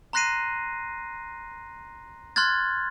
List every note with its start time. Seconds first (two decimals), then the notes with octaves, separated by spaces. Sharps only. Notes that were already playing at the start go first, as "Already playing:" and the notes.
0.13 A#5 C6 F#6 A#6 C7 D#7
2.36 C6 F6 F#6 G#6 A6